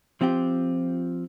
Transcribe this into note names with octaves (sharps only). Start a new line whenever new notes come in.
F3 C4 F4 G4